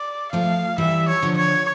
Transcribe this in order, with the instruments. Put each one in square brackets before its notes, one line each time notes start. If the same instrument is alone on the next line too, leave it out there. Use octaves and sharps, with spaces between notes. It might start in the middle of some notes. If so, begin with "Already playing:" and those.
Already playing: [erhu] D5
[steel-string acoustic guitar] F3 A3 [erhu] F5
[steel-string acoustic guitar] E3 G3 [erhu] E5
[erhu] C#5
[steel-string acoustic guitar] D3 F3
[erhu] C#5